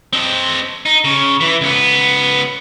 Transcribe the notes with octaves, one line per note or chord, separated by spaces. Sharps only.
C4 D#5
D#4
C#3
E3
C#2 B3